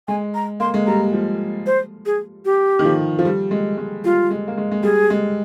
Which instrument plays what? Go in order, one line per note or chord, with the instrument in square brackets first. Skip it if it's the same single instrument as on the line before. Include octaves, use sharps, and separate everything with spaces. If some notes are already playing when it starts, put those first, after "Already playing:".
[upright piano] G#3 [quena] G#5
[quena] A#5
[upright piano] A#3 [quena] C6
[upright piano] G#3
[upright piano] G3 [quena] A#5
[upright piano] F3
[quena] C5
G#4
G4
[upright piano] D#3
F3
F3
G3
G#3
G#3
[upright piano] G3 [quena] F4
[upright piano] G#3
A#3
G#3
G#3
[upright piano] G3 [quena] G#4
[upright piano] G#3